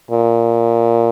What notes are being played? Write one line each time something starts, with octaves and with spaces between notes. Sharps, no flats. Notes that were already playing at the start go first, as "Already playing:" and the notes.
A#2